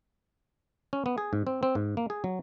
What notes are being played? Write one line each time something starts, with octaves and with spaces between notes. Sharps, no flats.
C#4
B3
G#4
G#2
C4
C4
G#2
A#3
G#4
F#3